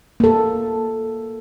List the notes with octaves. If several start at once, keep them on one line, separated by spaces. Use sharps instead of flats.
A#3 A4